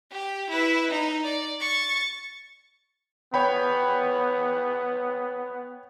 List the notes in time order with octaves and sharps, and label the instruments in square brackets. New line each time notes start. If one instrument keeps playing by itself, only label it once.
[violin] G4
E4 B4
D#4
D5
C#6 A6
[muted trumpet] B3 [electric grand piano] C#5 G5 B5